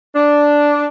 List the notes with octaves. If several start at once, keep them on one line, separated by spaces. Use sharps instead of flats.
D4